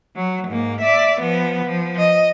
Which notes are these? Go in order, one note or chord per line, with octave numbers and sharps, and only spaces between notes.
F#3
G#2 A#3
D5 E5
F3 B3
F3
D#5